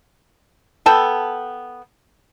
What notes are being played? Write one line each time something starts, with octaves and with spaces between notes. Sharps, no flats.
B3 A4 G5